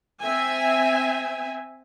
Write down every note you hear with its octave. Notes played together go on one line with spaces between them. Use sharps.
C4 E5 G#5